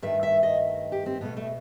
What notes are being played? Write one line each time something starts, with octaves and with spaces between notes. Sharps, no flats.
G2 D#3 A3 E5
E5
D#5
G4
C4
B2 A3 B3
A3